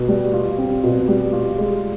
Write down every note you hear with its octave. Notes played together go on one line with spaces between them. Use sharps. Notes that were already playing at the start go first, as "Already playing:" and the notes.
Already playing: B2
G3
F4
C4
B2
G3
F4
G#3